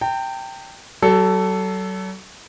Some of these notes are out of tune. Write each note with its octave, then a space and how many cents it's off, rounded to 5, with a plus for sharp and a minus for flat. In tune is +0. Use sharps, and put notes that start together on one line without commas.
G5 +0 A#5 -45
F#3 +40 A4 +0